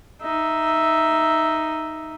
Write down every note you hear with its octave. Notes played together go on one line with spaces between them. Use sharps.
D#4 E5